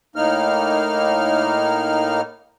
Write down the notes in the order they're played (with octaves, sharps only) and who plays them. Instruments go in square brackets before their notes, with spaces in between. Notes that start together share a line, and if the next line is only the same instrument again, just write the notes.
[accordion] A2 A#3 D#4 F6